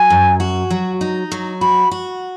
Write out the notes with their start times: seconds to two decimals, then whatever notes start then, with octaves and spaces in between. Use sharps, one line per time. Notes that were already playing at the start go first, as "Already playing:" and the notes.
Already playing: F#3 G#5
0.10 F#2
0.40 F#4
0.70 F#3
1.01 D#4
1.32 F#3
1.61 F#4 B5
1.91 F#4